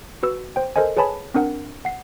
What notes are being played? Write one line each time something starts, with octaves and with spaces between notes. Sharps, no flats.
F#4 B4 E6
C5 G5
A4 A#4 C5 D#5 G#5
G#4 B4 C#5 G#5 A5 B5
C4 D4 A#4 F#5
F#5 C7